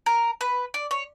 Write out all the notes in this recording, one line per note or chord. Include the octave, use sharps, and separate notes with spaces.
A#4
B4
D5
C#5